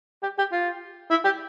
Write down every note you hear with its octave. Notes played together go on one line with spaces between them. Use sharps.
G4
G4
F4
E4
G4